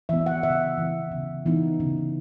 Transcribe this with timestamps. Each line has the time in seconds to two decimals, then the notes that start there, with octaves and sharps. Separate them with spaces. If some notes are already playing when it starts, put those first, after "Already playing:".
0.09 E3 B3 E5
0.26 F#5
0.43 C#3 E5
0.78 E3 B3
1.12 C#3
1.46 E3 B3 D#4
1.80 C#3